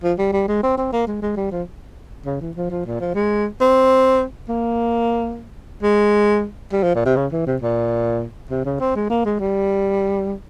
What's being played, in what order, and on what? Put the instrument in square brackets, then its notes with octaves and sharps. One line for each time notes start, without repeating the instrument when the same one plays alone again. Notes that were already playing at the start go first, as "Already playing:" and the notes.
[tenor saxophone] F3
G3
G3
G#3
C4
C4
A#3
G#3
G#3
G3
F3
C#3
E3
F3
F3
A#2
F3
G#3
C4
A#3
G#3
G3
F3
A#2
C3
C#3
E3
C3
A#2
C3
C#3
C4
G#3
A#3
G#3
G3